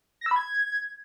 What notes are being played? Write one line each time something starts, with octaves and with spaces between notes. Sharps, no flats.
A#6
E6
B5
G#6